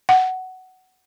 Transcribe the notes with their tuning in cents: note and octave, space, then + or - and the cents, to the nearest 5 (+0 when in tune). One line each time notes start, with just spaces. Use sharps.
F#5 +10